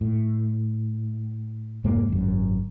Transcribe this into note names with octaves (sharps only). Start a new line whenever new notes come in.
A2
F1 G#2 G#3 A#3
G#1 F#2